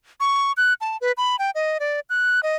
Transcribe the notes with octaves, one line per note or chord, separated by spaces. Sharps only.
C#6
F#6
A5
B4
B5
G5
D#5
D5
F#6
D#5